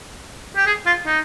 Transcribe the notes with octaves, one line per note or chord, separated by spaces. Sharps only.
G4
G#4
F4
D#4